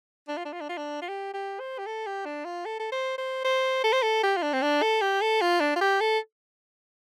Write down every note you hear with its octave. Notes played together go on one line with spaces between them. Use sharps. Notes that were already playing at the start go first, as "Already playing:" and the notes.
D4
F4
D4
F4
D4
F4
D4
F4
G4
G4
C5
G4
A4
G4
D4
F4
A4
A4
C5
C5
C5
A4
C5
A4
G4
F4
D4
C4
D4
A4
G4
A4
F4
D4
F4
G4
A4